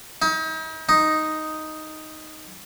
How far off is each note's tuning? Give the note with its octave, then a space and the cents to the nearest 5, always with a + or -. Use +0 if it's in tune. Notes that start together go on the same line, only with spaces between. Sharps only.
D#4 +40
D#4 +0